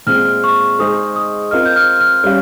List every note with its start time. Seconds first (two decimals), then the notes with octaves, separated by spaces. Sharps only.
0.07 A#2 G#3 C4 F6
0.44 C#6
0.79 G#3 D#4 G#4 C5 D#5 D#6
1.16 D#6
1.51 C4 F4 A#4 D#5 F6
1.65 G6
1.76 F6
2.01 F6
2.24 G3 C#4 G4 F5